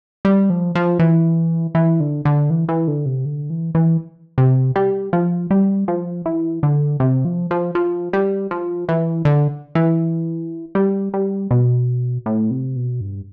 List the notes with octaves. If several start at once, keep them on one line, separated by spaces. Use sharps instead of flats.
G3
F3
F3
E3
E3
D3
D3
E3
E3
D3
C3
D3
E3
E3
C3
G3
F3
G3
F3
E3
D3
C3
F3
F3
F3
G3
F3
E3
D3
E3
G3
G3
B2
A2
C3
B2
G2